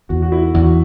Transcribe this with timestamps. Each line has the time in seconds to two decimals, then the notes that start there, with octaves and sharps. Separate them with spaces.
0.09 E2 F#4
0.22 F#4
0.32 E4
0.54 E2 F#4